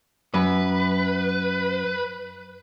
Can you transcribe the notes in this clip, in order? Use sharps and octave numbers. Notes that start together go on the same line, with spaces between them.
F#2 B4